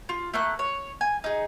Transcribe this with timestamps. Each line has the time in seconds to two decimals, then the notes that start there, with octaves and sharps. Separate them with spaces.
0.09 F4
0.34 A3 A#3 F#6
0.59 C#5
1.01 G#5
1.24 D#4 G#4